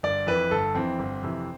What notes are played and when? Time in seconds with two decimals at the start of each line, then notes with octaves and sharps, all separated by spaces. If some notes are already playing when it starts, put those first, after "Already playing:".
0.03 G1 D5
0.27 F2 E3 B4
0.51 G1 A4
0.74 F2 E3 C4
0.99 G1
1.23 F2 C3 E3